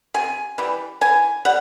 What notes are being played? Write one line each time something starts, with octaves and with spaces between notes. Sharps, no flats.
C3 G#5
E3 G3
E3 G#5
G3 F#5